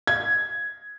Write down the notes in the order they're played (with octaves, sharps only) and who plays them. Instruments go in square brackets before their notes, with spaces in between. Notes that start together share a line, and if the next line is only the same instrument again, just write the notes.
[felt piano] G#6